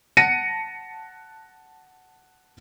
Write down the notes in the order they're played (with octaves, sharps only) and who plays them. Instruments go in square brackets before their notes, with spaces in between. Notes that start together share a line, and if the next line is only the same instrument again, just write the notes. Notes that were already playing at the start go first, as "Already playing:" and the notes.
[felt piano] F#5 A5 A#6 C#7 D#7